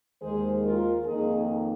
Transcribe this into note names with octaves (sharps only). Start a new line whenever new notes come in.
D#2 D#3 G#3 G#4 C5
F4 A#4
F2 D#3 A#3 D#4 G#4